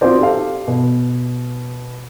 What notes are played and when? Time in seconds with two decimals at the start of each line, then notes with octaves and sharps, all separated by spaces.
0.01 C4 D#4 F4 F#4 C5 D5
0.20 G4 A4 F5
0.68 B2